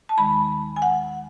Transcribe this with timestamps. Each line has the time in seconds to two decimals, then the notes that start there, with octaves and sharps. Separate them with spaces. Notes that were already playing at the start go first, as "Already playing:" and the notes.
0.09 A5
0.17 D#2 D#3 G#3 B5
0.76 G#5
0.82 F#5